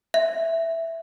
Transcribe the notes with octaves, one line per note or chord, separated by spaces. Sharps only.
E5